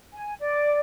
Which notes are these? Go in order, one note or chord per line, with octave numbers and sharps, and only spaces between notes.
G#5
D5